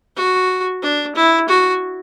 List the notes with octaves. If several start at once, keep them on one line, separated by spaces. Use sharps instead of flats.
F#4
D4
E4
F#4